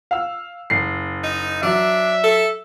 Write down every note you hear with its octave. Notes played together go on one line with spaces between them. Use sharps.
F5 E6
F#1 C7
D#4
F#3 D4 E5
A4